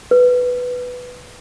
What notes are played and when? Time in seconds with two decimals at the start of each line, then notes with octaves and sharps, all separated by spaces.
0.11 B4